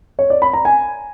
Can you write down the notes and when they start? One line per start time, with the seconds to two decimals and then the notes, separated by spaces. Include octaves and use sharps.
0.19 C#5
0.30 D5
0.42 B5
0.53 A#5
0.65 G#5